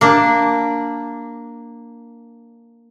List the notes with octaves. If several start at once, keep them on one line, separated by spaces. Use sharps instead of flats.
A#3 D4